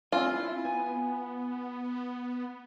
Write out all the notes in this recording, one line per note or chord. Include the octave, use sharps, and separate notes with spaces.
C4 F4 G#5
E4
B3 G#5